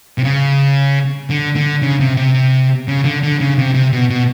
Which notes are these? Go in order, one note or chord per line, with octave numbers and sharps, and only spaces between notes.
C3
C#3
D3
D3
C#3
C3
C3
C#3
D3
D3
C#3
C3
C3
B2
B2